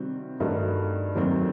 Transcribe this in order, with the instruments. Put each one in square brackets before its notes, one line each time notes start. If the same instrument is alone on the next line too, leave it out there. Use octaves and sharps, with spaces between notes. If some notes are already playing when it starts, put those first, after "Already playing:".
Already playing: [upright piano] C3 D#3 G3 C4 F#4
G2 D#3 A3 D#4 F#4
D#2 D#3 F#3 A3 C4